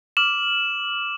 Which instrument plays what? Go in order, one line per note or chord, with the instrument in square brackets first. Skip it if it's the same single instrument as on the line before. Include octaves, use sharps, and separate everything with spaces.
[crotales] D6 F6 E7 F#7